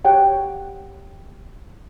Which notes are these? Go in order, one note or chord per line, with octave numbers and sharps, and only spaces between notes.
G4 C#5 F#5 G5